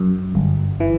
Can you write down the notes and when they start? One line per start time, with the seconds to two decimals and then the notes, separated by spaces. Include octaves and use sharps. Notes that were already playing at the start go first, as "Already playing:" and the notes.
Already playing: F#2
0.35 G1
0.80 E3